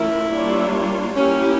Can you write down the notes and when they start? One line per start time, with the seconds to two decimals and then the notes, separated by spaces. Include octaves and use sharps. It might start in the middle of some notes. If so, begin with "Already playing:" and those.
Already playing: E3 A3 C#4 E4 F4 A#4
0.32 G3 A#3 D4 F4 C#5
1.16 A#3 C#4 E4 G4